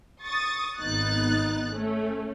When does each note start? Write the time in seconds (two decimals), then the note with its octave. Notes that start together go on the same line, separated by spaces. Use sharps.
0.24 C#6 D#6 A6
0.78 G#1 B3 D#4 F#6 A6
1.73 A3 C#4